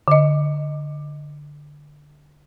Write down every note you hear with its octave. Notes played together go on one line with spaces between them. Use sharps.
D3 D#5